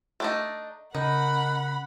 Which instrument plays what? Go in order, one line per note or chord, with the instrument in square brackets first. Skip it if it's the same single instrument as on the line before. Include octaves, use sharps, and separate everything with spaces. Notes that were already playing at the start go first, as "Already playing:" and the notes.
[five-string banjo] A3 D4 D#4
[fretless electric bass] C#3 [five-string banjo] D#4 [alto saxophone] A#4 [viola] F#5 B5